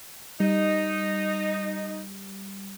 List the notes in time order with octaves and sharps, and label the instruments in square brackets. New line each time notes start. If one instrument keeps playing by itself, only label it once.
[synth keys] G3 [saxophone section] D#4